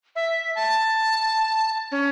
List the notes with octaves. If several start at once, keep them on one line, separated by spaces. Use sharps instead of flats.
E5
A5
C#4